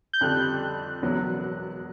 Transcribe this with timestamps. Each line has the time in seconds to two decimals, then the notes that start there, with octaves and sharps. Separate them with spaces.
0.13 G6
0.21 F2 D3 G3 F#6
1.02 E1 E2 B2 F#3 B3